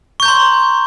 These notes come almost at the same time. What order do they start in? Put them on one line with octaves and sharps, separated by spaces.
C#6 G6 A#5 C6